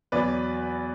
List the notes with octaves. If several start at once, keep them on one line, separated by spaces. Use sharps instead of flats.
E2 B2 F#3 B4 D5